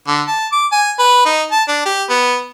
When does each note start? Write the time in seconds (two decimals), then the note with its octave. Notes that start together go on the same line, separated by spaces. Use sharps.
0.08 D3
0.28 A5
0.52 D6
0.72 G#5
0.99 B4
1.26 D#4
1.52 A5
1.68 D4
1.86 G4
2.10 B3